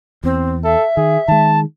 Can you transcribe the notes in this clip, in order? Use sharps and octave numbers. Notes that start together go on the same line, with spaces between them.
E2 C4
A4 E5
D#3 G#4
D#3 G#3 A5